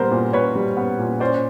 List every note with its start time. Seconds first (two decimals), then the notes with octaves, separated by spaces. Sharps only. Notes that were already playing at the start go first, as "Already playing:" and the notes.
Already playing: A#2 G3 B3 A#4 C5
0.12 A#2
0.33 A#2 B4 C#5
0.55 G3
0.77 B3
0.99 A#2
1.20 C#4 C5 D5